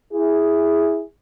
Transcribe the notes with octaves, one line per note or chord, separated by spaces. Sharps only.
E4 G#4